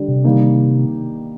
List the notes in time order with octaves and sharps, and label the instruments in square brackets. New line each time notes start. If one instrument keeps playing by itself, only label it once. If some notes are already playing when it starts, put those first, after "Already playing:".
Already playing: [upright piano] D3 G3 D4
[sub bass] C3
[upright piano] D#3 G3 A#3 D#4